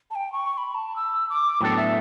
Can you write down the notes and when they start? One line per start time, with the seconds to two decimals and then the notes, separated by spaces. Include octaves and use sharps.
0.11 A5
0.15 G5
0.32 C#6
0.53 C#6
0.58 B5
0.75 A5
0.96 E6
1.29 D6
1.61 A2 F#3 B3 D4 A4 G5
1.77 E5